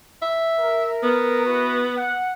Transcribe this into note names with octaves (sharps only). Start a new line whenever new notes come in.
E5
A#4
B3
E4 F#4 B4
F#5